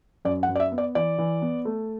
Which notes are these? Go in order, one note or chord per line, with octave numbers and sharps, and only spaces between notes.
F#2 D5
F#5
F#2
D5
E5
B3
D5
E3 D5
E3
B3
A3